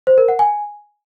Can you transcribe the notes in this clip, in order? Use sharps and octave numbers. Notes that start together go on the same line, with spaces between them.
C5
A#4
F#5
G#5